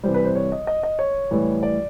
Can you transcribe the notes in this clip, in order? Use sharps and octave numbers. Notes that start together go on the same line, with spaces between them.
C3 E3 G3 C5
B4
C5
C#5
D#5
D#5
D#5
C#5
A2 E3 G3
D5